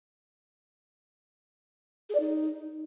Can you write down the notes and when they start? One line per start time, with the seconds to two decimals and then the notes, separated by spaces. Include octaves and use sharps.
2.10 G#4
2.15 D5
2.20 D#4